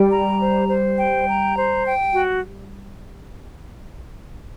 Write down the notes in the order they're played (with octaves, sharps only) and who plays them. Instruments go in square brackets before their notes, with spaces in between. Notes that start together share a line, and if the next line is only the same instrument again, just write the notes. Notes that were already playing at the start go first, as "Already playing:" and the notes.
Already playing: [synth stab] G3 [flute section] G5
[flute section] A#5
C5
C5
G5
A#5
C5
G5
F#4